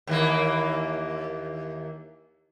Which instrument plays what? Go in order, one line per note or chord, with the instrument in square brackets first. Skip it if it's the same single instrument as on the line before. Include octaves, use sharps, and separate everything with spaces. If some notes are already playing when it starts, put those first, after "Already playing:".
[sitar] D#2 E3 A#3